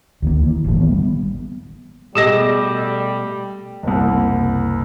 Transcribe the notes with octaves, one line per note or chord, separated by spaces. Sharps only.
D2 D#3 A#3
E3
G#1 A#2 F#3 A3
D#3 B3
G3 B3
B2 G3 A3 G4 G#4 D#5
F#1 C2